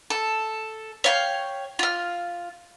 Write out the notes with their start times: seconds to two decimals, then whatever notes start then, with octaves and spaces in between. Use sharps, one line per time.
0.10 A4
1.04 C#5 F5 G5
1.79 F4 F6